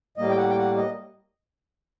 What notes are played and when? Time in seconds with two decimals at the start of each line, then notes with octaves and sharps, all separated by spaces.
0.17 A2 G3 A#3 D#5
0.30 G5
0.37 F#5
0.50 G5
0.58 F#5
0.76 D#5